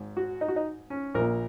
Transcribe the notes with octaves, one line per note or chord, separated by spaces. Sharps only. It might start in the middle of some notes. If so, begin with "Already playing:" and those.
Already playing: G#1 G#2
F#4
D#4
F#4
D#4
C#4
A#1 A#2 A#4